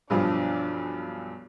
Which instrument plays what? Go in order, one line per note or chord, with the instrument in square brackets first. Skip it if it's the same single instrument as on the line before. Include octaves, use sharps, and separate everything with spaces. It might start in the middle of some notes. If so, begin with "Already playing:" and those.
[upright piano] B1 G2 F3 [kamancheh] D4